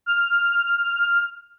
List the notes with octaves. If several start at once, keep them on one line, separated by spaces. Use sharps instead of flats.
F6